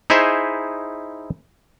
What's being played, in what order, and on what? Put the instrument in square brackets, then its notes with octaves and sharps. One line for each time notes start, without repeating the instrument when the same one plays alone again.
[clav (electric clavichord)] D#4 E4 G#4 C5 E5